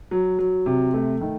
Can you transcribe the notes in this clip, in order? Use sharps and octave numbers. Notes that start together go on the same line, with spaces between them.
F#3
F#3
C3
A3
D#3